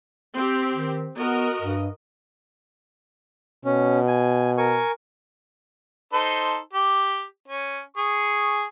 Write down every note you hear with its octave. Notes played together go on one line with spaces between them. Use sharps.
C4 G4
D#3
B3 F#4 A#4 D#5
G2
B2 C#4
G#5
A#4 G#5 C#6
D#4 A4 C5
G4
C#4
G#4 C#6